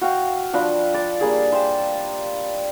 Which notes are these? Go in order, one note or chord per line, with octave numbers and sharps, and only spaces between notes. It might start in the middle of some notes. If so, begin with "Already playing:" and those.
F#4 F5 G5
F3 D4 D#5 B5
D5 C#6
G3 A#3 D4 G#4
C5 E5 G5